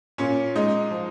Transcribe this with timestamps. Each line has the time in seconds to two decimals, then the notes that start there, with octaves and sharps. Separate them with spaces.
0.18 A#2 C#4
0.55 G#3 D#4
0.91 F3